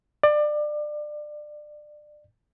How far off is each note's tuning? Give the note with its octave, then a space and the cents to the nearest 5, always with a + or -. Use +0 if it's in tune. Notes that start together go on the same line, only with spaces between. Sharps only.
D5 +25